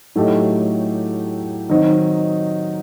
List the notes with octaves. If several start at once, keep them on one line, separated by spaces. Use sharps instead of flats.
A2 F#3 A3 D#4 G4
D#3 F#3 C4 D#4